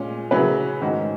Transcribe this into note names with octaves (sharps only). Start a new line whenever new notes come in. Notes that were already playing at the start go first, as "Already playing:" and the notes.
Already playing: A#2 G#3 C#4
C#3 F#3 C#4 E4 B4
G#2 D#3 G#3 C#4 F#4